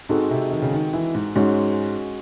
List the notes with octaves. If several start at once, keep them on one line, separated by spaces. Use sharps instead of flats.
G#2 G#3 C4 D#4 F#4 A4
C3
D#3
C#3
D#3
E3
G#2
G#2 G#3 C#4 F#4 C#5